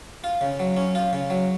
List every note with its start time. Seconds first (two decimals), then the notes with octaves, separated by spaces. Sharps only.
0.24 F4
0.41 C#3
0.60 F#3
0.76 C#4
0.95 F4
1.13 C#3
1.30 F#3